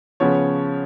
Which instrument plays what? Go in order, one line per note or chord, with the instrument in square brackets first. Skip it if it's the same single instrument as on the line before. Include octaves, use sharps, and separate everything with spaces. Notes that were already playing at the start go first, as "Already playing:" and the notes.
[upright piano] C#3 F3 B3 C#5